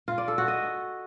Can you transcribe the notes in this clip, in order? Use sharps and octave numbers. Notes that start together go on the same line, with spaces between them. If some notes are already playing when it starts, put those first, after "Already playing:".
F4
D5
A4
F#4
D#5